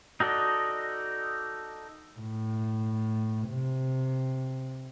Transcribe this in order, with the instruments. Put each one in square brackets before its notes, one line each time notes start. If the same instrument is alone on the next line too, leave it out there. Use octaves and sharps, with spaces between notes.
[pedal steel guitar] D#4 F#4 A4 D5 D#5
[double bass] A2
C3